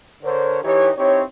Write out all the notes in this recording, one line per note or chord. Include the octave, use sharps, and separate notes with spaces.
D3 A#4 C5 C#5
E3 D#4 G4 C#5
C4 D#4 E4 G4 C#5